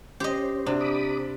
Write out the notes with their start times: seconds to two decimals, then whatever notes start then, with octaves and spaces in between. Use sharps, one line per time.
0.20 C#4 G4 C5 D#5
0.66 C3 D4 F#4
0.81 B5 D6 D#6